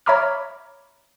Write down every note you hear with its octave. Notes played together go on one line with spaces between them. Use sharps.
C#5 E5 A#5 B5 D6 F6